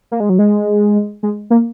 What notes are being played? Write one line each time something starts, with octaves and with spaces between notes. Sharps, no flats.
A#3
G#3
F#3
G#3
G#3
A#3